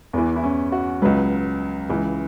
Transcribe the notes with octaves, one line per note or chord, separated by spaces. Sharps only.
E2 E3 B3
E4
C#4
F#4
C#2 C#3 F#3 B4
C#2 C#3 E3